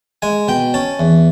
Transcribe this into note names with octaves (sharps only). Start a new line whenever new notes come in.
G#3 G#5
B2 G5
C#4 A5
E2